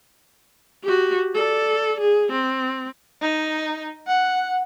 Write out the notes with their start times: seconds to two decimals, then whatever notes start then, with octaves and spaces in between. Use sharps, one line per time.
0.83 F#4 G4
1.34 A4 D5
2.00 G#4
2.32 C4
3.22 D#4
4.07 F#5